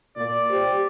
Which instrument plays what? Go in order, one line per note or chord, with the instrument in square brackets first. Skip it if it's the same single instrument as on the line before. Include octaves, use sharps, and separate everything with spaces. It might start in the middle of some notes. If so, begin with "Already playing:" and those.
[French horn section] A#2 [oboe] D5
[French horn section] G4 C5